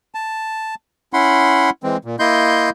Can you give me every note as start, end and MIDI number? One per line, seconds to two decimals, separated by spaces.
0.15 0.75 81
1.13 1.70 61
1.13 1.70 64
1.13 1.70 78
1.13 1.70 83
1.13 1.70 84
1.83 1.97 52
1.83 1.97 56
1.83 1.97 60
2.05 2.16 46
2.19 2.70 58
2.19 2.70 64
2.19 2.70 75
2.19 2.70 84
2.19 2.70 91